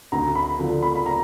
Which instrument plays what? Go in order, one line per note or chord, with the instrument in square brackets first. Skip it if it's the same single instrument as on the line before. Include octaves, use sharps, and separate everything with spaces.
[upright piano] D2 A#5
B5
D3 F3
B5
B5
A#5